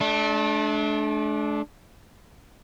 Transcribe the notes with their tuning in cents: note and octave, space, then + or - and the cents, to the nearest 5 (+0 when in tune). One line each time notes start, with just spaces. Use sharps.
A3 -40 D4 +0